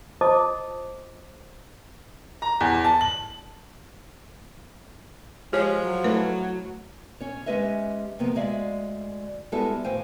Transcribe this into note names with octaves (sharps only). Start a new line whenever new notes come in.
F4 C5 D#5 A5 D6 D#6
A#5
E2
A5
F#7
F3 G#3 G4 C#5
F#3
A3 E4 B4
C#4 C#5
G#3 C#4 G4 B4 D#5 E5
C3 F3 A#3 B3
D2 G#3 D5 E5 F5
G3 G#3 B3 E4 F#4 A4
A2 E3 C5 F5 G5 G#5